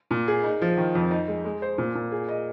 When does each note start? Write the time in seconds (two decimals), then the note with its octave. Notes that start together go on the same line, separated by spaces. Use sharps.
0.11 A#2
0.28 G#4
0.44 D#4
0.62 F3
0.77 D#3
0.95 F2
1.11 D#4
1.28 G#3
1.45 G#3
1.62 C5
1.78 A#2
1.95 A#2
2.12 G#4
2.29 D#5